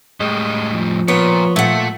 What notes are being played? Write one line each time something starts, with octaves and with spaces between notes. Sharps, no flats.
A2 G3 G#3
F3
A#2 B3 C#5
A#2 A3 E5 F#5